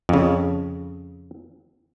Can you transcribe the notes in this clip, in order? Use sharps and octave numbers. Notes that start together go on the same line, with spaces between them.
F2 C#3